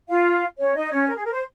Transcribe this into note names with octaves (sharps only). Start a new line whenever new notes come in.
F4 F5
C#4 C#5
D#4 D#5
C#4 C#5
A#4
G#4
A#4
C5